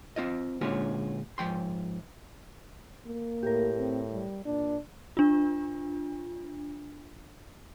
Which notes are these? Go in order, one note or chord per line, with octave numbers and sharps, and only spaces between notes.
C4 F4 D#5
A#2 D3 G#3 C#4 F4 F#4
G#2 F3 G5 C6
A#3
A2 G4 A#4
C4
G3
A#2 D4
D4 F4